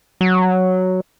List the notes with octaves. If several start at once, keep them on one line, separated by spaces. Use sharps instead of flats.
F#3